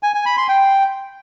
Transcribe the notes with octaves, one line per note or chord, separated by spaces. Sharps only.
G#5
G#5
B5
C6
G5